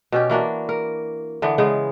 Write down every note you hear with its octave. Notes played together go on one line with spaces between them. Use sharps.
B2 C#4 G4
E3 A#3 D4 F#4
A#4
D3 E3 B3
C#3 G#3 B3